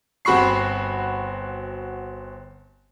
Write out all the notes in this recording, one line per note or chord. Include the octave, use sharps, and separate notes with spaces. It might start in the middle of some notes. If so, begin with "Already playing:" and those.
G1 C4 F#4 B5 C#6 C7